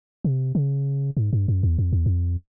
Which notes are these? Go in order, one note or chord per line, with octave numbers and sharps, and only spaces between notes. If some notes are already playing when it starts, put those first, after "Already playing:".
C3
C#3
G#2
G2
F#2
E2
F2
E2
F2